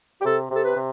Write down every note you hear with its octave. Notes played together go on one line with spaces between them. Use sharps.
G4
C3 A4
C3 A4
B4
C3